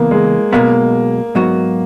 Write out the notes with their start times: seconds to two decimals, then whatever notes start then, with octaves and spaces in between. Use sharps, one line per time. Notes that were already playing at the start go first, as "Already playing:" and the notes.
Already playing: C#3 E3 A#3 B3
0.11 G#3
0.52 B1 B2 G#3 A#3 B3
1.35 G#2 F#3 B3 F#4